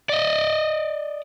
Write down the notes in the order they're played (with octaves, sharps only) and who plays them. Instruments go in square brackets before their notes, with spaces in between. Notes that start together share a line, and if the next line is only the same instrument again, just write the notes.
[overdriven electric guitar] D5 D#5